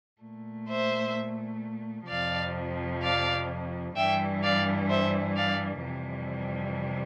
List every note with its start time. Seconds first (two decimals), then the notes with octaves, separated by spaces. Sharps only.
0.23 A#2 A3
0.70 C5 E5
2.09 F2 C3 F3 D5 F5
3.03 D5 F5
3.97 G2 E3 G3 E5 G5
4.43 D5 F5
4.90 C5 E5
5.37 D5 F5
5.84 F2 C3 E3 G3